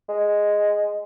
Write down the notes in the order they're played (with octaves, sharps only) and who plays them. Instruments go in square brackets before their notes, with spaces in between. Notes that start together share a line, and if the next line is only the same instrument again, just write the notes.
[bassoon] G#3